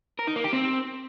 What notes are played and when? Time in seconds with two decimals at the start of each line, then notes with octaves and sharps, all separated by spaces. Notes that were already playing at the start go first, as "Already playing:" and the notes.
0.19 A#4
0.28 D#4
0.36 A#3
0.44 G4
0.53 C4